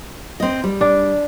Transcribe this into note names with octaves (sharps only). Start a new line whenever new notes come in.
C4 D#5
G3
D4